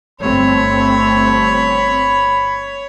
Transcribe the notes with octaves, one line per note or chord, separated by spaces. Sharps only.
G1 A3 C4 C#5 B5